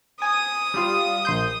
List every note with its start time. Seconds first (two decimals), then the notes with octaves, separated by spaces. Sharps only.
0.22 G#5 D#6
0.74 G3 F4
1.25 A#1 C6 G6